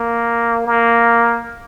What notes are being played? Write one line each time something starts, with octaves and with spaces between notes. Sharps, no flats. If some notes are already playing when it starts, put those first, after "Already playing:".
Already playing: A#3
A#3